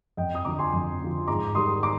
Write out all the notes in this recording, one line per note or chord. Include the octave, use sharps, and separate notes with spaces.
F2 D#5 G5
D#6
D3 F3 A#5 D6
G#5 C6
F2
D3 F3
G#2 A#5 D6
D#3 G3 C6 D#6
A#5 D6